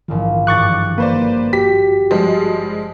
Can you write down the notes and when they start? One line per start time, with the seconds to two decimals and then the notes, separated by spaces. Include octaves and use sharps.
0.08 A#1 G#2 D#3 E3 F4
0.47 G#1 G2 C#6 D6 F#6 A6
0.98 A#3 B4 C5 D5
1.53 F#4 G4 B6
2.11 F3 G3 G#3